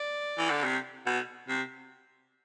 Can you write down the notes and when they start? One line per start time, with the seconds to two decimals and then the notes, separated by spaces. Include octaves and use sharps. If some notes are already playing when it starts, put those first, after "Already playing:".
Already playing: D5
0.38 E3
0.50 D3
0.64 C3
1.06 B2
1.48 C3